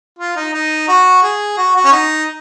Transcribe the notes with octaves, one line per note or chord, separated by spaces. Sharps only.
F4
D#4
D#4
F#4
G#4
F#4
F#4
C#4
D#4